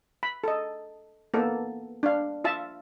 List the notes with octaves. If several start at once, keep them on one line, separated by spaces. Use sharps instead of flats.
B5
A4 D#5
A#3 B3 A4
D4 F5
F4 E5 A5